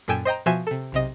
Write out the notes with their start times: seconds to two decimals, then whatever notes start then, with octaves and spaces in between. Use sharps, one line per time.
0.08 F#2 A#2 A4 G5 G#5 E7
0.25 C5 D#5 G5 A#5
0.46 B2 F3 F#4 C5 E5 G#5
0.67 C3 A4
0.92 B1 C3 D#5